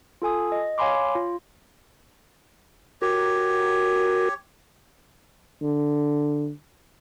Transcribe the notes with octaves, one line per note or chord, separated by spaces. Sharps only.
F4 A4 G#5 D#6
D#5
C#5 F5 G#5 B5 C6 D6
F4
F#4 G4 A#4 C#5
D3